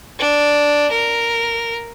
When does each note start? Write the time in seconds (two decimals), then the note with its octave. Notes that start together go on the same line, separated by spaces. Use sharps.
0.19 D4
0.91 A#4